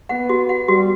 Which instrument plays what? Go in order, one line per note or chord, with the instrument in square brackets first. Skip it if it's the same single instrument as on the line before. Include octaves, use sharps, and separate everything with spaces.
[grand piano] B3 [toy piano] F#5
[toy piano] F#4
F#5
[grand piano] G3 [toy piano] F#4